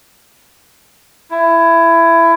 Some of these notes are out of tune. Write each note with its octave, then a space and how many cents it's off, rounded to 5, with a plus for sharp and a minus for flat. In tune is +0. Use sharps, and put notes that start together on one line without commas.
E4 +20